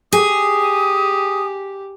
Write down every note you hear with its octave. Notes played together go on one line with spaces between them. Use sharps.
G4 G#4 D#6